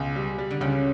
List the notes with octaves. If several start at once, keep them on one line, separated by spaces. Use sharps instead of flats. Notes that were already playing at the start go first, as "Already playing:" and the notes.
Already playing: C#2 B2
G3
G3
D3
C#2 C#3